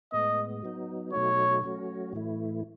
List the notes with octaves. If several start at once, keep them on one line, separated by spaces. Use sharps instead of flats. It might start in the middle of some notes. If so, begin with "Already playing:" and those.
A2 G#3 B3 D#5
F#3 B3 D#4
B2 F#3 A3 D#4 F#4 C#5
F#3 A3 C#4 F#4
A2 E3 A3 E4